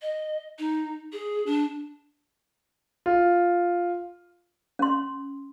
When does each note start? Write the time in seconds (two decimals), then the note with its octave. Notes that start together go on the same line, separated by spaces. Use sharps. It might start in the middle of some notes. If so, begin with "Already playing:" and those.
0.02 D#5
0.59 D#4
1.13 G#4
1.46 D4
3.06 F4
4.79 C#4 C6